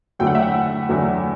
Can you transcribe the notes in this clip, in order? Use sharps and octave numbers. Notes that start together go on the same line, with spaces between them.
E2 D3 F#3 A3 G5
F#5
E5
F#5
E2 D3 F#3 A3